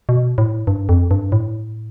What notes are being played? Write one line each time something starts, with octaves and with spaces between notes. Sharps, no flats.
B2
A2
G2
F2
G2
A2